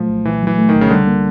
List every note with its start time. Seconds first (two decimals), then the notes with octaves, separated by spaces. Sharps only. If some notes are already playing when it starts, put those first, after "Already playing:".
Already playing: A#2 F3 F#3 A3
0.09 C2
0.25 A#2 E3
0.42 E3 F#3
0.58 A3
0.69 D#3
0.74 C2
0.81 C#3
0.90 D3 G3
1.07 A#3